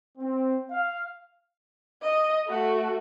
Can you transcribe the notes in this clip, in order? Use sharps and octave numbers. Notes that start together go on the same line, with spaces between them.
C4
F5
D#5
A3 F#4